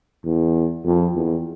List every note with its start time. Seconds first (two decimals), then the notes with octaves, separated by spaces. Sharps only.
0.25 E2
0.85 F2
1.15 E2